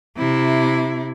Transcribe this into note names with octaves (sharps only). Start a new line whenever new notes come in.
C3 E4